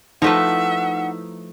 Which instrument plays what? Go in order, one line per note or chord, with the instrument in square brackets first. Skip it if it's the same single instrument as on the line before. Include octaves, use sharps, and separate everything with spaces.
[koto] F3 A3 B4 [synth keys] D#4 E4 [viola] E5 [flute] F#5